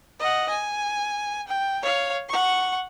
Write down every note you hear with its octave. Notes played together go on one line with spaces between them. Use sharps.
D#5 F#5
G#5
G5
C#5 F5
F#5 C#6